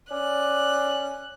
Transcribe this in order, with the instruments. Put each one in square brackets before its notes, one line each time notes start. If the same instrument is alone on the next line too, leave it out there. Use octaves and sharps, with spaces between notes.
[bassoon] C#4 [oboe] D5 [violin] F#6